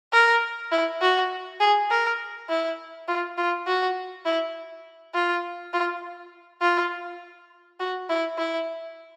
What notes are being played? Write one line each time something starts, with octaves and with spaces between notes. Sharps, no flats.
A#4
E4
F#4
G#4
A#4
E4
F4
F4
F#4
E4
F4
F4
F4
F#4
E4
E4